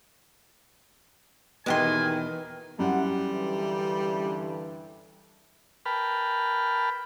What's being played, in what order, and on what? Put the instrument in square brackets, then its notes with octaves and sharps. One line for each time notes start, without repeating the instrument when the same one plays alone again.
[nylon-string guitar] E2 B2 B3 [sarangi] D#3 [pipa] G#3 G4 C6 [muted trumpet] G#5
[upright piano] F#2 [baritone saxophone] G3 [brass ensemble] E4 F#5
[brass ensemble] G2 D3 E3
[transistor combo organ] A#4 B4 G5 A5 B5 F6